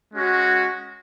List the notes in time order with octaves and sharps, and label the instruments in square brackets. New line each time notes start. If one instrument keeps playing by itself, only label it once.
[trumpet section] G#3 C#4 F#4